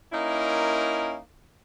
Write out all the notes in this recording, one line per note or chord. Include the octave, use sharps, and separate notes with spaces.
A#3 C#4 D#4 E4 A#4